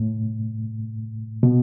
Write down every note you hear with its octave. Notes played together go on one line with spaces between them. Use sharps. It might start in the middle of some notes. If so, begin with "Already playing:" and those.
Already playing: A2
B2